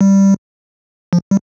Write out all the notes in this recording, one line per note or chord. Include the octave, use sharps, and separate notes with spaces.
G3
F3
G3